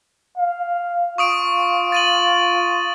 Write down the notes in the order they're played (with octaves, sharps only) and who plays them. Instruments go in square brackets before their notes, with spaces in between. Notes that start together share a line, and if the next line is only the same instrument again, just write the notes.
[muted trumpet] F5
[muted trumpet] F4 [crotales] C#6 D#6 D7
[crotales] A6 D#7 F#7